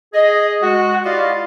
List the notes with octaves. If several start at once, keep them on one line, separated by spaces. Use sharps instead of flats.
G#4 D#5
G#3 F#4
E4 F4 G4 D5 D#5 F5